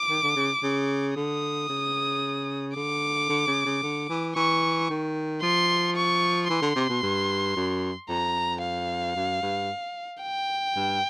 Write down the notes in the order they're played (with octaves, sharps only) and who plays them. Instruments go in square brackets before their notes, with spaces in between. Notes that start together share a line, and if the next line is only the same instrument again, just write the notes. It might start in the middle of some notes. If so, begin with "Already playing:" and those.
Already playing: [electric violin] D6
[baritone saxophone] D#3
D3
C#3
C#3
[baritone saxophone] D3 [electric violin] D#6
[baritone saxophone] C#3
[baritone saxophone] D3 [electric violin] D6
[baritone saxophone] D3
C#3
C#3
D3
E3
[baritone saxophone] E3 [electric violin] C#6
[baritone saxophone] D#3
[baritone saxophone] F3 [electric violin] C6
[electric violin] C#6
[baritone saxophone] E3 [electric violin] C6
[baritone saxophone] D3
C3
B2
G2
F#2
[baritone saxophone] F2 [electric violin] A#5
[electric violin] F5
[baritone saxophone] F#2
G2
[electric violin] G5
[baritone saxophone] G2